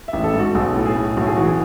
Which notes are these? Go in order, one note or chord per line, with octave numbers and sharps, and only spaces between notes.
E5
A1
A4
G#2
F#4
B1 G#4
A2 A4
G#4
A2
B1 F#4
G#4
E3 F#4
G#4